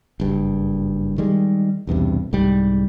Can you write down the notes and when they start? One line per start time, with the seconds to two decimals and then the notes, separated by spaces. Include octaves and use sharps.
0.20 F#1 G2
1.18 D#3 G3 G#3
1.87 B1 E2 G2 C3
2.33 C2 G#2 G3